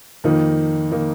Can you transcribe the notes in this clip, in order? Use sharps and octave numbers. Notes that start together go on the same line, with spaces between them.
F2 D#3 A#3 D#4
D#3 A#3 D#4